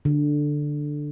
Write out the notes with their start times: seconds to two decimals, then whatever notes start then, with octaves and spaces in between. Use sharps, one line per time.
0.05 D3